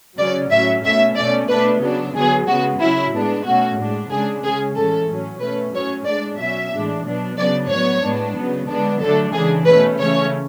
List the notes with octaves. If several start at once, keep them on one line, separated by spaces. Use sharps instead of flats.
C#3 F#3 C#4 D5
A2 F#3 C#4 E5
B2 A3 C#4 E5
B2 A3 C#4 D5
B2 A3 D4 B4
C#3 F#3 B3 D4
D3 F#3 B3 G#4
C#3 G#3 B3 F#4
C#3 F#3 C#4 E4
A2 G#3 B3 D4
B2 A3 C#4 F#4
A2 G#3 D4
C#3 G#3 D4 G#4
C#3 G#3 C#4 G#4
A2 E3 G#3 C#4 A4
A2 F#3 C#4
B2 A3 C#4 B4
A2 F#3 C#4 C#5
A2 G#3 D4 D5
B2 F#3 C#4 E5
A2 E3 G#3 D4
B2 F#3 B3 D4
C#3 F#3 B3 D4 D5
A2 F#3 B3 C#5
A2 G#3 B3 D4
C#3 F#3 B3
D3 G#3 B3 D4
D3 F#3 A3 D4 A4
C#3 E3 G#3 D4 G#4
B2 A3 C#4 B4
C#3 E3 A3 C#4 C#5